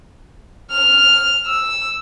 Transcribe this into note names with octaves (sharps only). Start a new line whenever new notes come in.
F6
E6